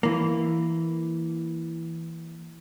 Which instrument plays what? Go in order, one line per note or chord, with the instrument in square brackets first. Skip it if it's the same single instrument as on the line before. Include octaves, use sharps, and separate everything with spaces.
[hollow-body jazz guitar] E3 A#3